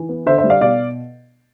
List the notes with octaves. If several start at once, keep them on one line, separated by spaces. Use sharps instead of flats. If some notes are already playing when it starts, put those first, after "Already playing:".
Already playing: E3
B3
D3 C5 E5
C5 E5
G3
D5 F5
B2 D5 F5